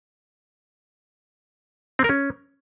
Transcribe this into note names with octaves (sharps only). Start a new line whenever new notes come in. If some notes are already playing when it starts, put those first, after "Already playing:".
C4
A#4
C#4